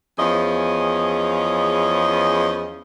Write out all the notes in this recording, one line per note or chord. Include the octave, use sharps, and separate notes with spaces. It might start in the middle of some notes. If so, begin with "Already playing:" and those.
E2 F3 C#4 G#4 D#5